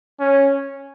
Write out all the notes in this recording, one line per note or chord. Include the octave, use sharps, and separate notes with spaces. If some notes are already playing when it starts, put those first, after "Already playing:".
C#4